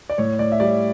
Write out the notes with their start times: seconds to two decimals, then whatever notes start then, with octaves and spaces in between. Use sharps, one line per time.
0.10 D5
0.18 A2 C#5
0.39 A2 D5
0.52 E5
0.60 G3 D5